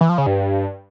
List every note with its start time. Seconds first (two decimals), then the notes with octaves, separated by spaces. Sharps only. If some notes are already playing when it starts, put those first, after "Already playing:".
0.01 E3
0.09 F3
0.18 C#3
0.27 G2